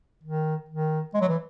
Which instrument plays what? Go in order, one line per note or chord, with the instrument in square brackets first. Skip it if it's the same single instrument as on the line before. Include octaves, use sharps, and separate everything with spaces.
[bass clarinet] D#3
D#3
G#3
F#3
E3